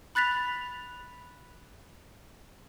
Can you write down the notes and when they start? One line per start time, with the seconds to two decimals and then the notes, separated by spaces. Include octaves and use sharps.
0.15 B5 F#6 A6 B6 F7